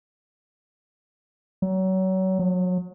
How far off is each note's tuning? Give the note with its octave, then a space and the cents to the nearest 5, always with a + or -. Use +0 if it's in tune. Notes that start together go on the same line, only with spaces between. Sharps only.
F#3 +30
F#3 -30